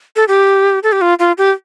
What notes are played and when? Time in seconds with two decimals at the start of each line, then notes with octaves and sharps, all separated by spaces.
0.16 A4
0.28 G4
0.83 A4
0.92 G4
1.01 F4
1.19 F4
1.38 G4